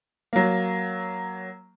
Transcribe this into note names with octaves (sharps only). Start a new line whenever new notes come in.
F#3 A#3